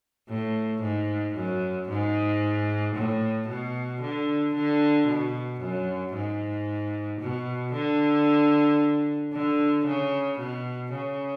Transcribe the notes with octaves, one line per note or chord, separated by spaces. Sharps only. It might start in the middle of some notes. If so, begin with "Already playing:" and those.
A2
G#2
F#2
G#2
A2
B2
D3
D3
B2
F#2
G#2
B2
D3
D3
C#3
B2
C#3